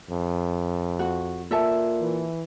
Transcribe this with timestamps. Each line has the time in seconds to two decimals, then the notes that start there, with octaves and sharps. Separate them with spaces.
0.10 F2
0.99 F#4
1.51 A#2 A4 E5 A5
2.01 E3